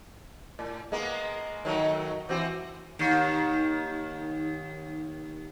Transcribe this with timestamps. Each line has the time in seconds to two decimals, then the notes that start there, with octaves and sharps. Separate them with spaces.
0.59 A2
0.92 G#3 A#3 B3
1.65 D#3 F#3 A3
2.29 E3 C4 F#4
2.99 D#2 D#3